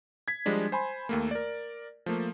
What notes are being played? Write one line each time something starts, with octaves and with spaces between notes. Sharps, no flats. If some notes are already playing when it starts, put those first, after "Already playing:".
G#6 B6
F3 G3 G#3 D4
C5 G#5 B5 C6
D#2 A3 A#3
A#4 D5
F3 A3 A#3